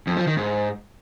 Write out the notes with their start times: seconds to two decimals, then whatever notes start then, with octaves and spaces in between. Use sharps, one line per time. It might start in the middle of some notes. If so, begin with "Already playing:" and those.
0.07 F2
0.17 F3
0.27 D#3
0.37 G#2